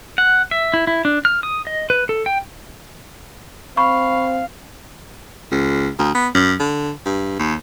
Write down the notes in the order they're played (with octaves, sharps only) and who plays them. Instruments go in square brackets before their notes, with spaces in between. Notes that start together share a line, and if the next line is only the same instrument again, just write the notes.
[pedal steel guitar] F#5
E5
E4
E4
D4
F6
D#6
D#5
B4
A4
G5
[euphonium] C4 [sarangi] F5 [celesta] B5 C#6
[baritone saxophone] C#2
D2
B3
F#2
D3
G2
D#2